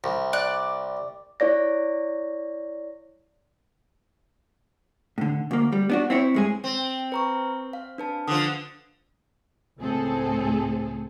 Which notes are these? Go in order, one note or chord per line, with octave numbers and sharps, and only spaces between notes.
C2
D5 F#6
E4 C#5 D5 A#6
A2 D3
D2 A#3
G3
B3 D4 F#4
C4 E4 C#5
G2 G#3 G#4
C4
B4 A#5 C#6
F5
D4 B4 A5
D3 F3 D#6
C#2 A2 C4 G#4 A4